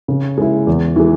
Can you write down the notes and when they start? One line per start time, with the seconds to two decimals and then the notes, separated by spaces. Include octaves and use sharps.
0.08 C#3
0.38 G#3 E4
0.67 E2
0.96 E3 G#3